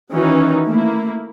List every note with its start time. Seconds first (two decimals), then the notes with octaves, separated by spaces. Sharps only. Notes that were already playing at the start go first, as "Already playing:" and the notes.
0.13 D#3 E3 C#4 D#4 F#4
0.65 A3 A#3 E4